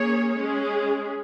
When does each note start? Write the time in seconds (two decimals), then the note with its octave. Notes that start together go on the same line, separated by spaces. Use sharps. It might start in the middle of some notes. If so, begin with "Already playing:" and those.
Already playing: A#3 C#4 G#4 C#5
0.37 G#3 C#4 G#4